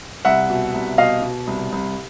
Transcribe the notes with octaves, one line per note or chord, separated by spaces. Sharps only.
C2 E5 F#5
B2
C2
B2 D#5 F5
B2
C2
C2